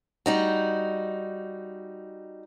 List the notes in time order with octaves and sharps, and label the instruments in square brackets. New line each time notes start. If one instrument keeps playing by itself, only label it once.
[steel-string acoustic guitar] G3 D#4 F#4